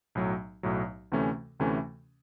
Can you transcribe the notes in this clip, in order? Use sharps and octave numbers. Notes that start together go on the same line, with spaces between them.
B1 A2 F#3
B1 A2 F#3
D2 C3 E3 A3 C#4
D2 C3 E3 A3 C#4